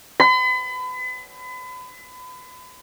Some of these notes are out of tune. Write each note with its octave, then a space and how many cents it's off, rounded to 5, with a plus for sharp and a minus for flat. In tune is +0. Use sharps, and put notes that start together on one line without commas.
B5 +35